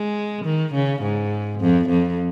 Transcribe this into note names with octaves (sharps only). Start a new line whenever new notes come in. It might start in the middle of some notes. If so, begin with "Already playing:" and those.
Already playing: G#3
D#3
C#3
G#2
F2
F2